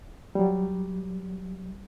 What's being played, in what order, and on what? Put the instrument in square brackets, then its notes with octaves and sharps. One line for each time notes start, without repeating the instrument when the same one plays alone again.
[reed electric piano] F#3 G3